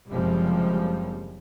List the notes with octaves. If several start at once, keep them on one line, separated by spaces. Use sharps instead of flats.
F#1 D#2 C3 F3 G3 G#3